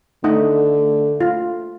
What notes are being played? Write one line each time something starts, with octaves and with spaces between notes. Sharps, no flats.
D3 A3 D#4 D#5 F#5
F4